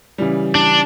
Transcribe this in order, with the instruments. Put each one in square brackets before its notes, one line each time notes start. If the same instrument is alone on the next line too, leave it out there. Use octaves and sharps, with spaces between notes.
[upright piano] C#3 E3 G3
[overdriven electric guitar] D4